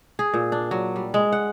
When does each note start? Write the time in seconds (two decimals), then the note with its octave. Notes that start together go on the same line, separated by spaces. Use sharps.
0.19 G#4
0.34 A#2
0.52 D4
0.71 F#3
0.96 G3
1.14 G#3
1.32 F#5